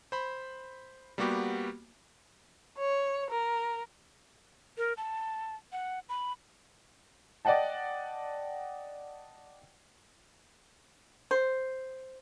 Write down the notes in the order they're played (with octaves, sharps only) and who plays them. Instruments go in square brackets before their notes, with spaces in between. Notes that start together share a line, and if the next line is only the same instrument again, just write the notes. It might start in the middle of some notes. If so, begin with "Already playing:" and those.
[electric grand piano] C5 B5
G3 A#3 B3 F#4 G4
[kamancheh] C#5
A#4
[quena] A#4
A5
F#5
B5
[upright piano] D5 D#5 F#5 G5 A5
[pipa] C5